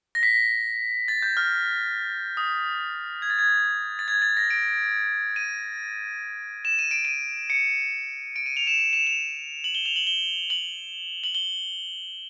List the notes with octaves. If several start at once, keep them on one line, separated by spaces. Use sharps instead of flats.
A#6
B6
A6
G6
F6
D#6
G#6
A6
G#6
A6
G#6
A6
A#6
D7
D#7
E7
D#7
D7
D#7
C#7
D7
D#7
F7
E7
E7
E7
F7
F#7
G7
F7
F#7
G7
F#7
F#7
G7